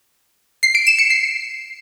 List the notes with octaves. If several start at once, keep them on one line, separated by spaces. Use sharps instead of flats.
C7
D7
E7
C#7
C7